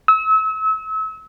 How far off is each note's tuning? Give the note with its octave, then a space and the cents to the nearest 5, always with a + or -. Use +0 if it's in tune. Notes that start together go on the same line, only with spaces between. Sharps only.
E6 -35